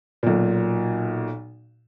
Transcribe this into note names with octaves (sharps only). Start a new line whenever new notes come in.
B1 A#2